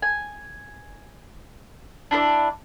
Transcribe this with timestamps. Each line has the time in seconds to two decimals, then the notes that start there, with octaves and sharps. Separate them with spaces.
0.02 G#5
2.11 D4 E4 A4 D5